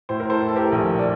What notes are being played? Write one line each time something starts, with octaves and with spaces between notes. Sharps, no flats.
A2 C5
A#4
A4 C5
A2
A4
G4 A#4
A#1
D5